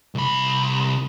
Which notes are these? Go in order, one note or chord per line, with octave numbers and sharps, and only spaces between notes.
C2 B5